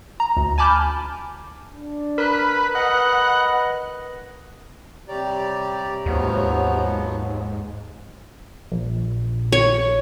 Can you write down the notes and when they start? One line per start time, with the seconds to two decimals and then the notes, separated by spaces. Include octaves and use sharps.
0.20 A#5
0.37 D2
0.58 G#5 A5 B5 D6 F6 G6
1.72 D4
2.18 A#4 B4 F#6
2.75 B4 D#5 F#5
5.08 C3 G3 G4 C#5 D5 A#5
6.06 D#2 G#2 F3 F#3 B3
8.72 A#1
9.52 C#5